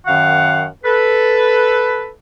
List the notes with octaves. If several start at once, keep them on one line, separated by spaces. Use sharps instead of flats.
F#2 D#3 F5 F#5
A4 B4